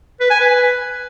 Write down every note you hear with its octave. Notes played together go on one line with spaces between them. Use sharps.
B4
G#5
B4